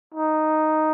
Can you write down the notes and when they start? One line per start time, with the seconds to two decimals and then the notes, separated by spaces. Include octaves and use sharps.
0.15 D#4